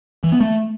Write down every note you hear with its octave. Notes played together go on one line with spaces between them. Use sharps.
E3
B3
A3